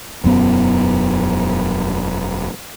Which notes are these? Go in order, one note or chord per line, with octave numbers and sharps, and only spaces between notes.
E1 F#2 B3